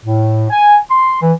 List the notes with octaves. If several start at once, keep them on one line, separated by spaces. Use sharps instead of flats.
A2
G#5
C6
E3